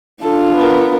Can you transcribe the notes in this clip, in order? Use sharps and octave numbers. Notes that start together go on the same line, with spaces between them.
D4 F4 A4
B3 A#4